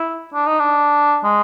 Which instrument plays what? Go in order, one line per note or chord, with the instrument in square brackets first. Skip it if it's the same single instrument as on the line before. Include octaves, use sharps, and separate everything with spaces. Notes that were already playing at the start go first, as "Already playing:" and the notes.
Already playing: [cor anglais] E4
D4
D#4
D4
G#3